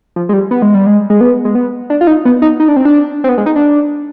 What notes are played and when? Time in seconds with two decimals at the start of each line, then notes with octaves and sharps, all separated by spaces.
0.16 F3
0.29 G#3
0.33 G3
0.51 B3
0.62 G#3
0.74 G3
0.86 G#3
1.10 G#3
1.21 B3
1.45 G#3
1.55 B3
1.90 D4
2.01 F4
2.07 D#4
2.25 B3
2.42 D#4
2.60 D#4
2.68 D4
2.76 C4
2.85 D4
3.24 C4
3.29 B3
3.38 G#3
3.46 D#4
3.56 D4